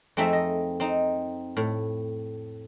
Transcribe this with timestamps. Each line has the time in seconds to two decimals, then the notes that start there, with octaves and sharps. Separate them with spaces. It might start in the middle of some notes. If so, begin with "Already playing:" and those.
0.17 F2 A3 C4 D#4 G#4 E5
0.33 D#5
0.80 C4 D#4
1.57 A2